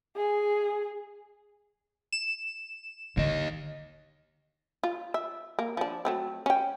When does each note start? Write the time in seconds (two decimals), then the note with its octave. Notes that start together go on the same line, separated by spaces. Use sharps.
0.17 G#4
2.13 E7
3.17 D#2 D3 D#5
4.84 F4
5.14 E5
5.59 A#3
5.77 F3 D4
6.05 F#3 A3 C4
6.46 C#4 G5